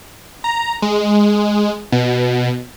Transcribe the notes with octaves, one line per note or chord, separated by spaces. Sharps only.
A#5
G#3
B2